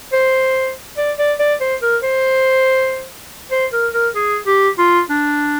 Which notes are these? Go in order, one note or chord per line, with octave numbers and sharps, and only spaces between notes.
C5
D5
D5
D5
C5
A#4
C5
C5
A#4
A#4
G#4
G4
F4
D4